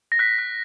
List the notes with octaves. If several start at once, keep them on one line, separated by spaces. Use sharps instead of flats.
A#6
F#6 B6
F#6